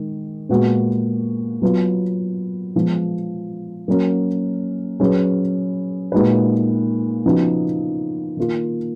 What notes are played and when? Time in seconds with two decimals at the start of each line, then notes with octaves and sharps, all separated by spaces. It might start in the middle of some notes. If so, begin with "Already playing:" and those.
Already playing: D#3 G#3
0.49 A#2 G#3 B3 F#4
1.62 F#3 B3 F4
2.75 F3 G#3 B3
3.88 F#3 A#3 C#4 F#4 A#4
5.00 F#3 C#4 G#4 B4
6.12 A#2 G#3 D#4 F#4 B4
7.25 C#3 F3 B3 D#4 F#4
8.37 D#3 A#3 F4